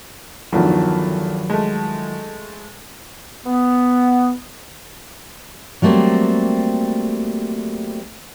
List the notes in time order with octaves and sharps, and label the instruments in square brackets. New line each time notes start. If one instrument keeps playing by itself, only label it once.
[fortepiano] E2 G2 A3 [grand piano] D#3 F3 F#3
[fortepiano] G#3 A3
[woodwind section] B3
[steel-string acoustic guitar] F#3 G3 A3 A#3 C4